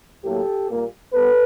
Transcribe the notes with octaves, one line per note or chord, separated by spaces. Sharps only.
A2 F#3 A#3 G4 A4
A#2 G3 A#3
G3 B3 A4 B4